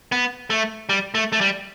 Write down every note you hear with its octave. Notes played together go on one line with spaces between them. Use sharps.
B3
A3
G3
A3
A3
G3